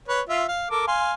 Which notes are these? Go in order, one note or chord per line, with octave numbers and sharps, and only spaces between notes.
B4 C#5
F4 E5
F5
A4 A#4 D6
F5 G#5 C6